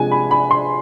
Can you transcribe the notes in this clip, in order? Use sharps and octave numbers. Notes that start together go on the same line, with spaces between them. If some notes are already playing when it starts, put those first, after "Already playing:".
Already playing: C3 F3 G#3 D4 G#5
B5
B5
C6